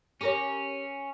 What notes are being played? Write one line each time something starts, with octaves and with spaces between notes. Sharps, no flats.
C#4 G4 A#4 C#5